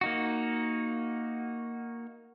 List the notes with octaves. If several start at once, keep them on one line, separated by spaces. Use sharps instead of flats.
A#3 D#4 F#4